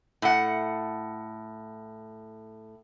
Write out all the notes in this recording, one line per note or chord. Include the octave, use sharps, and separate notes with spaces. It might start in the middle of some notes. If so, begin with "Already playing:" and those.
A2 F#5